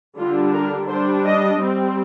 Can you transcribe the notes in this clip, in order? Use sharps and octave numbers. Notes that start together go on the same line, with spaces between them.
D3 G3 D4 F4
A#4
G3 D4 C5
D#5
G3 C4